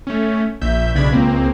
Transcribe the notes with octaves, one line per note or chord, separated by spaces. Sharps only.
A3 C#4
A#1 E5 G6
B1 C#3 D4 B5 G#6
C#2 A#3 C4